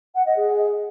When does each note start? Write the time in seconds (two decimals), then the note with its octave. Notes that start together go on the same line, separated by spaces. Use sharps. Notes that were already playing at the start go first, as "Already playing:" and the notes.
0.14 F#5
0.25 D#5
0.36 G#4